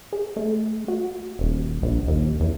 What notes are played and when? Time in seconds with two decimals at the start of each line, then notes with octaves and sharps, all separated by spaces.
0.13 G#4
0.36 A3
0.88 F#4
1.39 D#1
1.83 A#1
2.07 D#2
2.40 E2